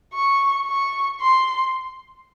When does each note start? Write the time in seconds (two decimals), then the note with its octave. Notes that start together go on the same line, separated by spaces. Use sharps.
0.13 C#6
0.66 C#6
1.20 C6